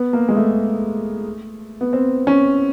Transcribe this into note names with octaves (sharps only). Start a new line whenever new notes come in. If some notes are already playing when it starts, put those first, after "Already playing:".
Already playing: B3
A#3
G#3
A3
B3
C4
C#4